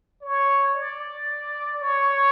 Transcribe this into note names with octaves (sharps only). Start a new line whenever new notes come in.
C#5
D5
C#5